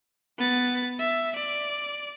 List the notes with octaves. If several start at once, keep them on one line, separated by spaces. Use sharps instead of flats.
B3 A6
E5
D5